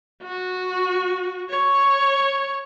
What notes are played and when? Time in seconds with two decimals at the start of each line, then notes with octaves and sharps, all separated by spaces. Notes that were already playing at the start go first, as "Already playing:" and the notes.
0.22 F#4
1.49 C#5